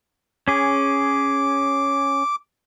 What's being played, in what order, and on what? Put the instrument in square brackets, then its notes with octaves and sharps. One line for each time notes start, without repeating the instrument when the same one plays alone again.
[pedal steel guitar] C#4 G#4 [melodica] D6